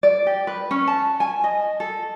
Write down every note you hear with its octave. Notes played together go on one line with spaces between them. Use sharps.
D5
G4
B4
C#4
A5
G#5
D#5
A4